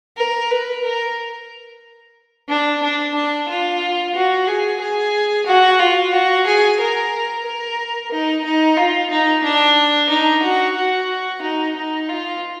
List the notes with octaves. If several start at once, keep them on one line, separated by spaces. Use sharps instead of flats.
A#4
B4
A#4
D4
D4
D4
F4
F#4
G#4
G#4
F#4
F4
F#4
G#4
A#4
A#4
D#4
D#4
F4
D#4
D4
D#4
F#4
F#4
D#4
D#4
F4